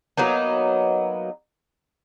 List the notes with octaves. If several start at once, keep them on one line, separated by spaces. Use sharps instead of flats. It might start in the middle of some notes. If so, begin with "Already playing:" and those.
F#3 A#3 B3 D#4